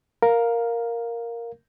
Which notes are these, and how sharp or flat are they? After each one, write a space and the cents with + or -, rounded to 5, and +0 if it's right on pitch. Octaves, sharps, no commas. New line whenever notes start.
A#4 +0 F5 +10